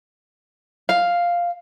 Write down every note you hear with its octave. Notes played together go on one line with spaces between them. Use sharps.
F5